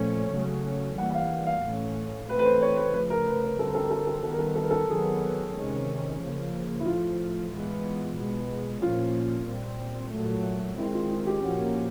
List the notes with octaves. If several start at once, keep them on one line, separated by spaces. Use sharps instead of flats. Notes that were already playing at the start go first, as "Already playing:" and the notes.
Already playing: A#2 F3 A3 C#4 C#5
C#3 F#3 A3 C#4
E3 G3 A#3 F#5
F#5
F5
F5
A2 E3 A3 C#4
E3 A3 C4 B4
B4
C5
C#5
B4
C#3 F3 A3 B4
A#4
B4
B4
D3 G3 C4 A4
A#4
A4
A#4
A4
A#4
A4
A#4
D#3 G3 B3 A4
A#4
A4
A#4
A4
A#4
A4
D#3 F#3 B3 G#4
C3 D#3 G#3 C#4
C#3 F3 A#3
E4
A2 F3 A3 F4
E3 G#3 B3
B2 G#3 B3
A#2 F3 A#3 C#4 F4
A#2 G3 C4
A#2 F#3 A3
D#3 G#3 C4 E4
F4
F4
G4
A#2 F3 A#3 C#4 F#4